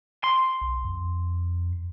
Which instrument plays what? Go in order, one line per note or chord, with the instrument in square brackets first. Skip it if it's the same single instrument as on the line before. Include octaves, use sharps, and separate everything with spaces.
[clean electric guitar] C6
[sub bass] B1
F2